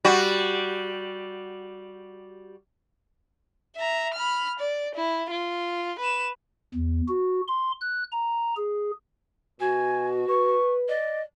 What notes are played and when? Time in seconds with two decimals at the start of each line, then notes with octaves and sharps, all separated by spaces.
0.05 G3 F#4
3.76 E5 A#5
4.14 B5 F6
4.59 D5
4.95 E4
5.31 F4
5.99 B4 E7
6.74 E2
7.08 F#4
7.48 C6
7.81 F#6
8.12 A#5
8.57 G#4
9.60 B2 F#4 G#5
10.28 B4 C#6
10.88 D5 D#5